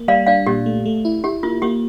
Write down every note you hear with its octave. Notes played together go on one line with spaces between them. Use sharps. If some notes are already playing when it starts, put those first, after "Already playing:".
Already playing: A#3
G3 D5 F5
D4 D5 F5
A#2 G4
A3
A3
E4
E4 G4
A#3 F4
A#3 G4